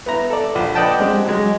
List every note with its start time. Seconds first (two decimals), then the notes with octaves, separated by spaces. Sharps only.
0.06 B3 E4 A#5
0.30 A4 D5
0.55 A#1
0.75 B4 D5 D#5 F#5 G5 A5
0.99 G#3 C4 G4
1.25 F#3 G#3